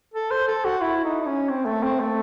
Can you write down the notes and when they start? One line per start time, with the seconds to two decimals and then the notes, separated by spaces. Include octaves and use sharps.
0.14 A4
0.31 C5
0.48 A4
0.65 F#4
0.82 E4
1.04 D#4
1.22 D#4
1.27 C#4
1.49 C4
1.66 A3
1.83 C4
2.00 A3